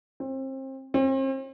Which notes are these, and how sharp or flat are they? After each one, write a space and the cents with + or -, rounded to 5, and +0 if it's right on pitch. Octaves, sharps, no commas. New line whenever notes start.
C4 +30
C4 +40